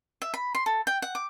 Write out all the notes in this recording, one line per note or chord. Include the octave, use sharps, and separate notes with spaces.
E5
B5
C6
A4
G5
F#5
D6